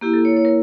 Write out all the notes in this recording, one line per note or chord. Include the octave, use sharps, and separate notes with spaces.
A#3 E4 G4
A4
C#5
C#5
A#4